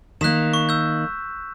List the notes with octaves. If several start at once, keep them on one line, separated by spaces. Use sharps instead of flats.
D#3 A#3 F#6 B6 E7
C#6
E6 G6